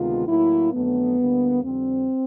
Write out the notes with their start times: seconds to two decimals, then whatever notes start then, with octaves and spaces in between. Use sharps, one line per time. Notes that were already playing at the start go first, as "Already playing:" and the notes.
Already playing: D2 C3 D#3 G#3 B3 F4
0.28 A2 F#3 A#3 E4
0.72 F2 D3 F#3 A3 B3
1.19 D2 D3 G3 A#3
1.63 F2 D3 G3 C4